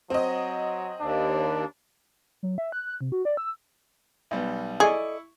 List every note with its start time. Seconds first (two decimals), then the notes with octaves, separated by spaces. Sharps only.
0.10 F#3 C4 D#5
1.00 D#2 D4
2.43 F#3
2.58 E5
2.72 F#6
3.01 C3
3.12 F#4
3.25 D5
3.37 E6
4.31 B1 G3 B3
4.80 E4 G#4 A4 D5 D#5 C#6